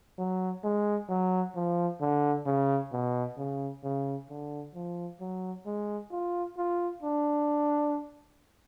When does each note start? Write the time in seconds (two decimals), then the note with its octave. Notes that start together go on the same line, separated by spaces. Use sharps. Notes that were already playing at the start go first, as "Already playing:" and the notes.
0.18 F#3
0.64 G#3
1.09 F#3
1.55 F3
2.01 D3
2.46 C#3
2.92 B2
3.37 C#3
3.83 C#3
4.29 D3
4.75 F3
5.20 F#3
5.66 G#3
6.11 F4
6.57 F4
7.03 D4